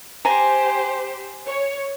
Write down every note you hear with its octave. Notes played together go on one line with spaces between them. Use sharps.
G4 C5 G#5 A#5
C#5